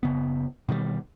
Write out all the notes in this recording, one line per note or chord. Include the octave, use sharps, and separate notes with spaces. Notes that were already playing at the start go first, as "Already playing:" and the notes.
F#1 C#3 B3
B2 D#3 E3 G3